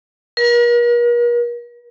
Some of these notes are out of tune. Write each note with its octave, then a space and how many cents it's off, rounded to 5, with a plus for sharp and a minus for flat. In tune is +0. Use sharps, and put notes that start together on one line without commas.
A#4 +45